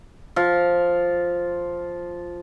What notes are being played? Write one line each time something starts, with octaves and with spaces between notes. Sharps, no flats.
F3 F5